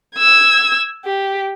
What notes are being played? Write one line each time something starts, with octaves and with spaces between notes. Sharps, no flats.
E6 G#6
G4